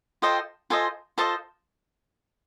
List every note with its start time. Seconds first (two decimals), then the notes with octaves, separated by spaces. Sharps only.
0.22 F4 A4 C5 D#5 G5
0.70 F4 A4 C5 D#5 G#5
1.18 F4 A4 C5 D#5 A5